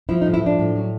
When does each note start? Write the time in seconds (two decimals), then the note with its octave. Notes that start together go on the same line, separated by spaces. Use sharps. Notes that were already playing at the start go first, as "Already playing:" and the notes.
0.09 F3 E4
0.21 D#4
0.25 A2
0.34 E4
0.42 F3 D4
0.59 A2
0.75 F#3